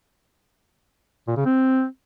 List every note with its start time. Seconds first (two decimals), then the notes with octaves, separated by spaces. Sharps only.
1.28 A#2
1.37 C#3
1.45 C4